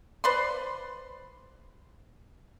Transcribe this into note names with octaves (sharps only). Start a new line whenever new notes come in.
B4 C5 D5 C6